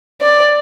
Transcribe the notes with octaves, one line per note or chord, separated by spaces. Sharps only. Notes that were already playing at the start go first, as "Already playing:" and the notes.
D5